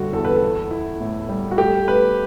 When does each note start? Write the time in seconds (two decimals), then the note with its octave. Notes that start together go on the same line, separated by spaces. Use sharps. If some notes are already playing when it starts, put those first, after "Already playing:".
Already playing: F#1 D3 G3 F#4 A4
0.13 E2 A4
0.25 B4
0.36 A4
0.42 E4
0.71 E4
1.00 A2
1.29 G3
1.51 F#4
1.58 A3 G4
1.87 A3 B4